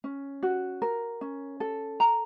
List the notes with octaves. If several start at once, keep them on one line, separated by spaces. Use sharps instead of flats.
C#4
F#4
A#4
C#4
A4
A#5